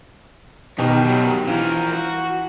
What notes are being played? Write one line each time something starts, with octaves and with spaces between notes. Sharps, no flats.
B2 D#3 G4
D#3 F#3
E3 F3 A#4
F#4